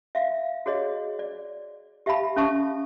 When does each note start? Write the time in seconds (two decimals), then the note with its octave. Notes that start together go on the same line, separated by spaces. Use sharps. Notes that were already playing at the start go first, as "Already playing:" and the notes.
0.15 E5 F5
0.66 F#4 G#4 C#5 D#5
1.19 D5
2.06 G4 E5 F5 A5 B5
2.36 C#4 A4 E5 A5 C#6